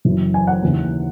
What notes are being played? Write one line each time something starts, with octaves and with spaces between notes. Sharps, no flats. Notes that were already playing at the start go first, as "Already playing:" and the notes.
F#1 F#2 E3
G#5
F#5
D#2 C#3 E3